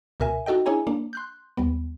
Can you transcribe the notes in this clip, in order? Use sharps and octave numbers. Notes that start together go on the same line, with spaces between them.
C#2 B2 A#4 E5 G#5
D#4 F#4 A4 D#5 G5
D4 E4 G#4 C#5 G#5 A#5
A#3 D4
C6 F#6 G6
D#2 G3 B3